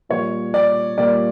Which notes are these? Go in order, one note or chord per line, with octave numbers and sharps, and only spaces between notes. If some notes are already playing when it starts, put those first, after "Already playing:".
A#2 G3 A#3 C#5
D5
A#2 G3 A#3 D5